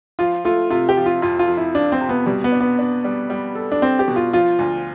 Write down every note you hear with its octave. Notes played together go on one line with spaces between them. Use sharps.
F3 F4
A3 F4
C3 F4
G4
F3
F4
F2 F4
F4
F3
E4
F3 D4
C4
C3
B3
B2 G3
B3
D4
B3
D4
G3
G3
A4
D4
C4 D4
G4
B2
F4
F3 F4
D2